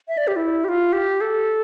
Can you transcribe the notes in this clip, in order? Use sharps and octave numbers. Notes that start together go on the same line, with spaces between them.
E5
D5
G4
E4
G4
F4
G4
A4